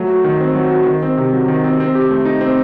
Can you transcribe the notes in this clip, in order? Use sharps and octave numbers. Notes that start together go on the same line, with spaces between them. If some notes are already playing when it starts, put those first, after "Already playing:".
Already playing: F#3 A3
F#4
D#3
C4
F#3
F#4
D#3
C4
C3
F#3
D#3
C4
C4
G4
A3
D#4
C4